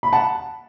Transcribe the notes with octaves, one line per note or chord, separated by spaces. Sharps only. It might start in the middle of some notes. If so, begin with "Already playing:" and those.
B5
F#5 A5